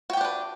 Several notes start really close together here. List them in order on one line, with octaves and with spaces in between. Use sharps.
F#4 G5 G4 D4 B4